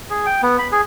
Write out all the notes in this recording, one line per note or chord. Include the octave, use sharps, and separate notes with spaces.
G#4
G5
B3
B5
G#4